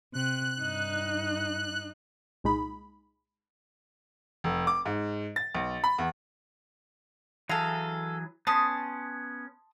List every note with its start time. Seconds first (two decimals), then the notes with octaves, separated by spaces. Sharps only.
0.14 C3 F#6
0.61 G2 D#4
2.44 C2 A#2 G#3 D#4 B5
4.44 F1
4.67 D6
4.86 G#2
5.36 A6
5.55 B1
5.84 B5
5.98 E2
7.49 E3 F#3 G#4 A4 F5
8.47 B3 C#4 A5 C6 D#6